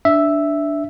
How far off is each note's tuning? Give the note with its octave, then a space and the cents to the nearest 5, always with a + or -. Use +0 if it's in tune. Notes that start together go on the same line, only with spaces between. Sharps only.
D4 +0 E5 +0